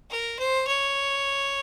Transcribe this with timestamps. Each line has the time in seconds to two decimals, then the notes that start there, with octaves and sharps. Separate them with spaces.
0.10 A#4
0.39 C5
0.67 C#5